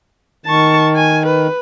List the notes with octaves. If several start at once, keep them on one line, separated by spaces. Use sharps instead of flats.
D#3 A5 C#6
G#5
B4